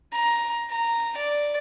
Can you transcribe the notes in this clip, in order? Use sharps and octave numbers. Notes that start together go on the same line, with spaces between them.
A#5
A#5
D5